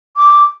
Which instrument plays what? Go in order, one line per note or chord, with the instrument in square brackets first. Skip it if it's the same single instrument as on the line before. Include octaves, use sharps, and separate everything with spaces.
[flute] D6